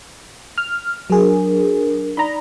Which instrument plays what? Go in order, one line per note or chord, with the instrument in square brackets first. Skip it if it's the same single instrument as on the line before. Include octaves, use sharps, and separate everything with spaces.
[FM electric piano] F6
[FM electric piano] F#3 G#4 [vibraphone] D4 A#4
[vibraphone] D#4 D5 [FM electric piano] A#5 B5